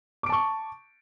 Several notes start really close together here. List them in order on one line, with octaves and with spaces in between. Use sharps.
D6 D7 A5 C#6